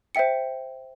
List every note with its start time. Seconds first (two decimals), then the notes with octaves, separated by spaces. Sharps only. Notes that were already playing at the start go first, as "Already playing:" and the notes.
0.15 C5 E5 G5 C#7